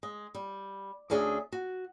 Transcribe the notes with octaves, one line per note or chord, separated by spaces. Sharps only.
G#3
G3
D2 C#4 D4 G#4 D#5 E5
F#4